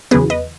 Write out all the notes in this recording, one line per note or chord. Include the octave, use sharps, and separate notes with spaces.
E2 C#3 F#3 B3 G#4 B4
B4 D#5